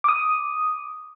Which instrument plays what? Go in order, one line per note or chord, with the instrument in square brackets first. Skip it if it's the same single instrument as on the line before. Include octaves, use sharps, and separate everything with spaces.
[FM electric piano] D6 D#6